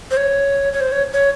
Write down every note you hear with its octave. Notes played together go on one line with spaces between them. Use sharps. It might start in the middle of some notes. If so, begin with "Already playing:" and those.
C5
C#5
C#5
C5
C#5
C#5